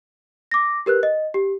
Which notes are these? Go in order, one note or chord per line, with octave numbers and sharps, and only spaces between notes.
D6 A#6
G4 A#4 B4 F#6
D#5
G4